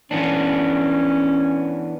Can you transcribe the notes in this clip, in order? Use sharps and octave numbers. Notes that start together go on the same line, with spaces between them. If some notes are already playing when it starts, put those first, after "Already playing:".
E3 B3 C#4 D4